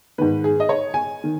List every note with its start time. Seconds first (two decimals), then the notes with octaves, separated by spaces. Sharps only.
0.18 G#2 D#3 B4
0.44 G#4
0.60 D#5
0.69 C#5
0.94 G#5
1.24 D#3